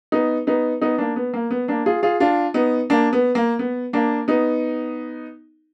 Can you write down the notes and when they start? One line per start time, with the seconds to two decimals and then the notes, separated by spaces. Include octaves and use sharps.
0.12 B3 D#4
0.47 B3 D#4
0.82 B3 D#4
0.98 A#3 D4
1.16 B3
1.34 A#3
1.51 B3
1.68 A#3 D4
1.86 F4 G#4
2.03 F4 G#4
2.20 D4 F4
2.54 B3 D#4
2.90 A#3 D4
3.13 B3
3.35 A#3
3.59 B3
3.93 A#3 D4
4.28 B3 D#4